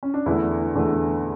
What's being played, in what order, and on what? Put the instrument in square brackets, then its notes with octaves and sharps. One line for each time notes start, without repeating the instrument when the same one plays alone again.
[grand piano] C#4
D4
E2 D3 A3 E4
E2 D3 A3